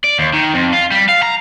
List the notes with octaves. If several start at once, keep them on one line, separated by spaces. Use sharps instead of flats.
D5
D#2
D#3
F2
F4
G3
F5
A#5